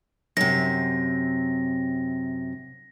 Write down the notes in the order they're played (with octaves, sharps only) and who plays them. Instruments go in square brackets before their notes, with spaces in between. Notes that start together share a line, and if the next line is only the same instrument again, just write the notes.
[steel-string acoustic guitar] F#2 C3 [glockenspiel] A#6